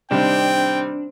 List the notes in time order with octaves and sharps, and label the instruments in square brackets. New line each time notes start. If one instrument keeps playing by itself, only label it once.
[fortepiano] C3 D#3 G3 [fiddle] C4 [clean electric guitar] D4 [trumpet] G5